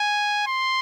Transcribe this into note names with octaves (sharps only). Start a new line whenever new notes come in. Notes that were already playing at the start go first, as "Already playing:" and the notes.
Already playing: G#5
C6